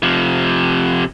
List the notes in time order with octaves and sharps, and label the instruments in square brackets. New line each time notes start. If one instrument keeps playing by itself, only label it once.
[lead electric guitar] C3 F3